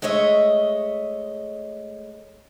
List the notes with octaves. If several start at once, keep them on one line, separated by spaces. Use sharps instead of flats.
G#3 A3 C#5 D#5 E5